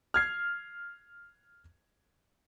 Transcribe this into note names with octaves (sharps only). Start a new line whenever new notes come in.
F6 G#6 C7